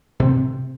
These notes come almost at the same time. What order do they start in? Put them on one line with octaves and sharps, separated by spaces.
C3 C4 A2